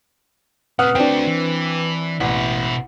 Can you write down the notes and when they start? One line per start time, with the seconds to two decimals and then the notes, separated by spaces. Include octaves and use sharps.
0.79 A2 C3 B4 F#5 D#6 F6
0.95 A3 C4 D4 F#4 G5
1.27 E3
2.20 A1 B2 E4 F#5